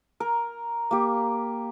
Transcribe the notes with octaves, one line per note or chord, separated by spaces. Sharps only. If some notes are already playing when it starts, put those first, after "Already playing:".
A#4
A#3 G4